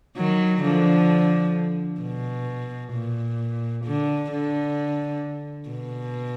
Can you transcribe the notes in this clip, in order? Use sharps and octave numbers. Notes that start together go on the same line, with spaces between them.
D#3 F#3
D3 F3
B2
A#2
D3
D3
B2